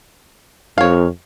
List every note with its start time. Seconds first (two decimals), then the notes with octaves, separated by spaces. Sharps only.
0.78 F2 C#5 F5